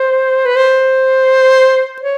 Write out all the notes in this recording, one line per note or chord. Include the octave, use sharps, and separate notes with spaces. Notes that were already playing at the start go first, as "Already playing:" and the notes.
Already playing: C5
B4
C5
C#5